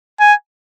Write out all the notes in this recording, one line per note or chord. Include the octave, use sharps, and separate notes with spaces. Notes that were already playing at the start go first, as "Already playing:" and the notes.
G#5